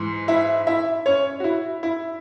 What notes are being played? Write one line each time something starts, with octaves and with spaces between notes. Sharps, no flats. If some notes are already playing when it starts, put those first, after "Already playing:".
Already playing: G#2 E3
E4 E5
E4 E5
C#4 C#5
F#4
E4
E4